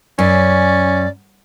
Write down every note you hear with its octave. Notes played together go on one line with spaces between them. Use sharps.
F#2 C#4 D5